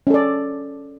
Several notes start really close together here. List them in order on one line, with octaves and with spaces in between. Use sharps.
C#4 A4 D5